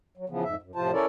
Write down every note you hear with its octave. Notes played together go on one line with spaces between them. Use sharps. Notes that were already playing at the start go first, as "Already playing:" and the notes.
F#3
C#3 E3 F3 B3
F2 G#2 E5
F#2
A2 C3 F3 F4 C5 A5
C#4 E4 A4 A#4 C#5 D5